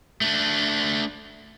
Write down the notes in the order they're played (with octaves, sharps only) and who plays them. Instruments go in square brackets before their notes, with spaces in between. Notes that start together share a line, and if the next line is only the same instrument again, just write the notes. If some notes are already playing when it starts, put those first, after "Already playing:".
[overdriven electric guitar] A3 D4